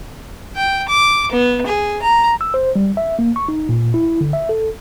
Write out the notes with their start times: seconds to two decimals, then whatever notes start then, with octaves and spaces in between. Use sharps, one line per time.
0.56 G5
0.88 D6
1.32 B3
1.67 G#4
2.02 A#5
2.41 E6
2.54 C5
2.76 G3
2.97 E5
3.19 A#3
3.36 C#6
3.48 D#4
3.69 A#2
3.94 E4
4.21 D3
4.33 E5
4.49 A4